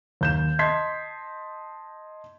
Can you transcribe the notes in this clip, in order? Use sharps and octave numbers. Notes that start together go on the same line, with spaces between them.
D#2 G6 E7
D#5 A5 C6 G#6 B6 C7